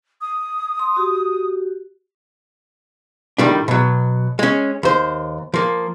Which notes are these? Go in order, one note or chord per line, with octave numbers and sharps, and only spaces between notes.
D#6
C6
F#4 G4
A2 D#3 G3 D4
B2 F#3
G#3 C#4
D#2 C5
F3 A#3